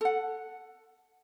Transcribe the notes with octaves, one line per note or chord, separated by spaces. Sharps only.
A4 F#5